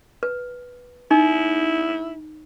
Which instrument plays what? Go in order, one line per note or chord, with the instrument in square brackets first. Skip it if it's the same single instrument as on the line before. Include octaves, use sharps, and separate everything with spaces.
[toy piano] B4
[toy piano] D#4 [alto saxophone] E4